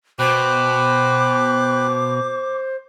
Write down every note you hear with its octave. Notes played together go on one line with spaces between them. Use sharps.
B2 C5 G5 B5 D6 F#6